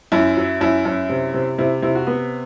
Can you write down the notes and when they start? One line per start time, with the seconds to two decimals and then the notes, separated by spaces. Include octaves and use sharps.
0.12 F#2 E4
0.37 F#3
0.61 F#2 E4
0.85 F#2
1.09 C3
1.34 C3
1.58 C3 E4
1.82 C3 E4
1.95 F#4
2.07 B3